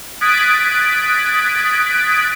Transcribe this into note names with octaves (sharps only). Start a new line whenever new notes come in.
D#6 F#6 G#6 A6 B6 D7